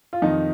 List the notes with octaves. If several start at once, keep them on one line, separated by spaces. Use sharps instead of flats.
F4
F2 C3 D#3 D#4